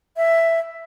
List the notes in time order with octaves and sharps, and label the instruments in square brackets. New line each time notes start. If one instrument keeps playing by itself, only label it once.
[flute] E5